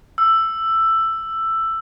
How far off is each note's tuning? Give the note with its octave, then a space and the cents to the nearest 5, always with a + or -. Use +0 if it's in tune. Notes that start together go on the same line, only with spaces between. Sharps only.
E6 +10